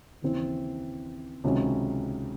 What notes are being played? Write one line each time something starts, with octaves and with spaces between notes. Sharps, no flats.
D#2 C#3 E3 C4
C#2 C3 D#3 F#3 C#4